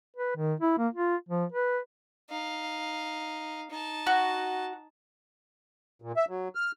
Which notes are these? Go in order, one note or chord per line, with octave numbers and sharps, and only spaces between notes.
B4
D#3
E4
A#3
F4
F3
B4
D#4 F5
D#4 A5
F#4
A#2
E5
F#3
F6